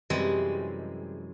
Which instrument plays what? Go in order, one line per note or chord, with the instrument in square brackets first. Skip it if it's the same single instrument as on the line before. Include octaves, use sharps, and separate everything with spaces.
[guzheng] F#2 C3 E3 G3 G#3